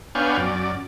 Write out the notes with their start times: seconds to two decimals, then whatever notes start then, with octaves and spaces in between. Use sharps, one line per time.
0.15 B3 D4 C#5 F5 G5 G#5
0.37 F#2 D5